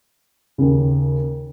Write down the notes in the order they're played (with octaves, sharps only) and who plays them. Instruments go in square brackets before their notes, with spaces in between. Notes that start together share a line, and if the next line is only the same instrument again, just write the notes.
[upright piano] D#2 C#3